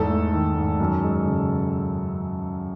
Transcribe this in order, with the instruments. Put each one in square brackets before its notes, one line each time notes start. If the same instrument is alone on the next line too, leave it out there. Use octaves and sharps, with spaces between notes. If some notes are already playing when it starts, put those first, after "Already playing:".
Already playing: [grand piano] E2 G#2 A4
A3
D#3
G#2
F#2
G#3
C#3